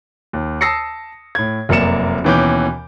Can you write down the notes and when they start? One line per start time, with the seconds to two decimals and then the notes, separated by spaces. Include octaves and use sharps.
0.33 D#2
0.61 A5 D#6 E6 A#6 C7 C#7
1.35 A2 G#6
1.69 F1 F#2 A#3 D5 C#7 E7
2.24 D#2 B2 E3 C#4 D6 G6